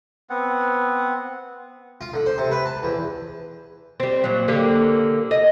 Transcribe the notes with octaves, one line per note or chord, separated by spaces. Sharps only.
B3 C4 F#5
F4
D3
C5
C3
B4
A5
E2
G3 C4
A#2 F#3
D3 A#3 G4
D#5